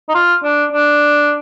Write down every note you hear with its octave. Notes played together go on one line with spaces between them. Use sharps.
D#4
F4
D4
D4